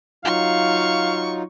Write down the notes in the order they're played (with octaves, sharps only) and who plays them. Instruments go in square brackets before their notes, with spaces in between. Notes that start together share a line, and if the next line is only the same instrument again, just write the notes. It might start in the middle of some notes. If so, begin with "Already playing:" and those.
[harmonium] F#3 D#4 F4 [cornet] F5 [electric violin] C#6